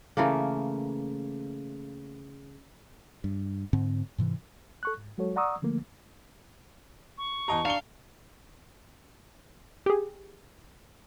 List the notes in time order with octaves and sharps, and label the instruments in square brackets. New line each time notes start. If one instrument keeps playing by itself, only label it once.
[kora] C#3 E3 A3 A#3
[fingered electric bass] G2
G#2 D3 C4
G#2 C3 E3
[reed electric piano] A4 C#6 F#6
G#2
F#3 G#3 F#4 A4 C#5
D5 F#5 A#5 C#6 D#6 E6
D3 F3 A3 A#3
[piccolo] C#6
[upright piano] E2 D#5 A#5 [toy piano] G4 A5
[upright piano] D4 C#7 G7 [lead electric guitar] F5 [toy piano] A#5
[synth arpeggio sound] G4 G#4